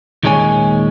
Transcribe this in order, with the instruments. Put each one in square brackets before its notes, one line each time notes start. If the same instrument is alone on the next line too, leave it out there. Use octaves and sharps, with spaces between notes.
[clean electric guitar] D#2 A#2 G#3 C#4 C#5 G#5